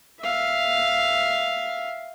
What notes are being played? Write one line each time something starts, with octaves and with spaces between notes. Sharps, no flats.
E5 F5